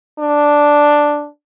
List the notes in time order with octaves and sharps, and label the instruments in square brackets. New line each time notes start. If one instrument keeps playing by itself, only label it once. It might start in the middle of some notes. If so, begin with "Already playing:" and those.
[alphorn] D4